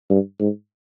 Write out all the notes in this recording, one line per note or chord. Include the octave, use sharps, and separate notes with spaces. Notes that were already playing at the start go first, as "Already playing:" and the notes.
G2
G#2